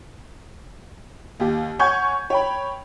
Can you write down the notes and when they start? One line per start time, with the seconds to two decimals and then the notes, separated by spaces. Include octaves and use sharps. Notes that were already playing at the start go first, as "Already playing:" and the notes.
1.40 D#2 G4
1.79 C#5 F#5 G#5 C#6 G6 G#6
2.30 C#5 G5 B5